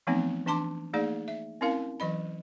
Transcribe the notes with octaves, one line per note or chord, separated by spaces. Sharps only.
E3 F3 A3 B3 C4 D#4
E3 D4 A5 C6 D6
A3 A#3 D#4 G#4 D5
E5
C4 C#4 E4 A#4 F5
E3 F#3 D#5 B5